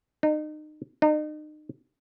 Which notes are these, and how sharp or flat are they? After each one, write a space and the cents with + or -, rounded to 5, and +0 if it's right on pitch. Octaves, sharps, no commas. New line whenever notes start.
D#4 -30
D#4 -35